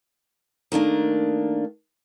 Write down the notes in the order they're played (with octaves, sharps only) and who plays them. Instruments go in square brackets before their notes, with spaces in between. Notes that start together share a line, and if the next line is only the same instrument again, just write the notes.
[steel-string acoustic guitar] D#3 A3 A#3 D4